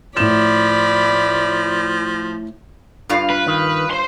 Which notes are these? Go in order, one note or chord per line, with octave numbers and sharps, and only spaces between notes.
A2 F3 D5 B5 E7
G2 F4 F5
B4
D#3
C5 C6